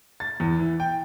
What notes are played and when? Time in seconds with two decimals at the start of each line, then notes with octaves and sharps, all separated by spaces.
0.20 A6
0.40 E2
0.59 E3
0.80 G5